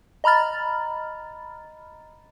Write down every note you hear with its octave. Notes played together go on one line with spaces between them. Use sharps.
D#5 A#5 B5 F6 A6